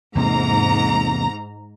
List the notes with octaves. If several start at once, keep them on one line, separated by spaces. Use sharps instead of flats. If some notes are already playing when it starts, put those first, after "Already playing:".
E2 G#2 C3 A#3 A#5